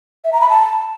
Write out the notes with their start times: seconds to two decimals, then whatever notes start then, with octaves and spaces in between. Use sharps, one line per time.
0.24 E5
0.33 A#5
0.41 B5
0.49 A5